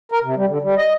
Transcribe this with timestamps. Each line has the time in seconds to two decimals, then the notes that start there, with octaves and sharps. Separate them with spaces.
0.12 A#4
0.24 C3
0.37 G3
0.49 D3
0.62 G3
0.77 D#5